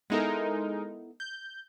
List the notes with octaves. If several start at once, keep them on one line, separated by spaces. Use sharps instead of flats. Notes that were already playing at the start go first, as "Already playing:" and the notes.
G#3 B3 D#4 E4 A4 A#4
G6